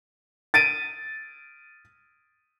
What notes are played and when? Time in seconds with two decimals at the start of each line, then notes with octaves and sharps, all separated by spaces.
0.54 A6 D7 D#7